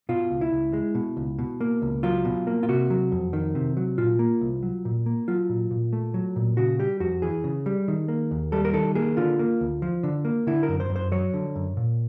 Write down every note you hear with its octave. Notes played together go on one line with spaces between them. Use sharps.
B2 F4
C#2
E4
C#2
G#3
B2
C#2
B2
A#3
C#2
F#3 F4
B2
A#3
F4
C3 F#4
F#3
F2
D#3
C3
F#3
A#2 F4
A#3
C2
F#3
A#2
A#3
F#3 F4
A#2
A#2
A3
F#3
A#2
C#3 F#4
G3 G4
F2 F#4
E3 G#4
C#3
G3
D#3
A#3
D#2
G3 A4
A#4
D#3 A4
A#3 G#4
D3 F4
A#3
D2
F3
D3
A#3
D3 E4
A#4
F#2
C5
F#2
C5
F#3 C#5
D3
F#2
A#2